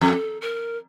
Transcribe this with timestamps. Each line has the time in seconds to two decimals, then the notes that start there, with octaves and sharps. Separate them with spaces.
0.01 F2 A4
0.41 A#4